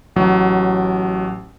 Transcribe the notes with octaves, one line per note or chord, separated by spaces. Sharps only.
A1 F#3